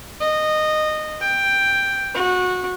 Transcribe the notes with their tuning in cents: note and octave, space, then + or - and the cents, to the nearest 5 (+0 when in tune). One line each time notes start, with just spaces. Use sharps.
D#5 -15
G5 +5
F#4 -20